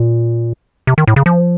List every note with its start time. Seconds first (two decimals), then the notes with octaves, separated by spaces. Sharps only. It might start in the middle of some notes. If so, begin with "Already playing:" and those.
Already playing: A#2
0.87 C3
0.98 D#3
1.07 A2
1.16 C#3
1.26 F3